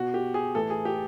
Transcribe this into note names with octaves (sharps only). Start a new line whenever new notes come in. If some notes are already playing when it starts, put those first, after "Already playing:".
Already playing: B2 F#4
G4
G#4
A2 E3 A4
G#4
G4